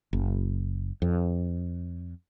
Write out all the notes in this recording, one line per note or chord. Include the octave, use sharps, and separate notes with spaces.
F#1
F2